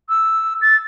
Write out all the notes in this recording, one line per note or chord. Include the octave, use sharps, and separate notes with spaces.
E6
A6